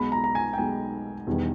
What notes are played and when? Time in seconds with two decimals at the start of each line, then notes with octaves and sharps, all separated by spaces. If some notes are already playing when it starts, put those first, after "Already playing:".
Already playing: B1 B2 G#3 B5
0.12 A#5
0.24 A#5
0.35 G#5
0.53 G5
0.58 B1 B2 G#3 G#5
1.27 E1 E2 D#3 G3